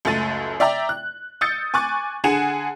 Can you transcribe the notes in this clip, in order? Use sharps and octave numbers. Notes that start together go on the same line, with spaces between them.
C#2 F#2 A3 A6 D#7
D5 E5 G5 A#5
F#6
D#6 E6 G6 A6 C#7
G#5 C#6 D6 F#6 A6
D3 G#4 F#5 G#5 E7